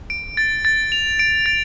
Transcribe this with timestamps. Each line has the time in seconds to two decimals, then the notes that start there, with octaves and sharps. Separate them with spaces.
0.10 D7
0.37 A6
0.65 A6
0.92 F7
1.19 D7
1.46 A6